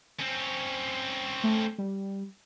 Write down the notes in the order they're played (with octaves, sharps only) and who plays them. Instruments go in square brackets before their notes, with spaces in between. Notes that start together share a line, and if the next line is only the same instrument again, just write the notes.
[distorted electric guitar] C4 C#4
[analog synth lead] A3
G3